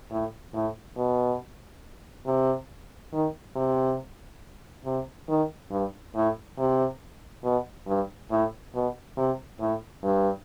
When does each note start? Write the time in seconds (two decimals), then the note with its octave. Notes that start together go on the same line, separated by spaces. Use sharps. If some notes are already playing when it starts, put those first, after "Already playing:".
0.11 A2
0.54 A2
0.97 B2
2.26 C3
3.12 D#3
3.56 C3
4.85 C3
5.29 D#3
5.71 G2
6.15 A2
6.58 C3
7.44 B2
7.87 G2
8.31 A2
8.74 B2
9.17 C3
9.60 A2
10.03 G2